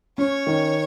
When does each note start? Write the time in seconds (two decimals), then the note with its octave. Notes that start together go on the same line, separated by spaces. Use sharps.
0.18 C#4 C#5
0.47 D#3